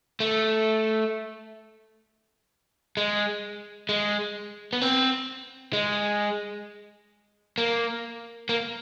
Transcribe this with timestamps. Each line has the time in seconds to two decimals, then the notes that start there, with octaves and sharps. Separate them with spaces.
0.20 A3
2.97 G#3
3.89 G#3
4.73 B3
4.81 C4
5.73 G#3
7.58 A#3
8.49 A#3